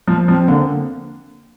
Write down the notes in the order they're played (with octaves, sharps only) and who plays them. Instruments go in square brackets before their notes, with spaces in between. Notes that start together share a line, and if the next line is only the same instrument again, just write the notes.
[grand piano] F3 [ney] A#3
[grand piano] F3 [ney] C4
[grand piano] D3 [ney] A#3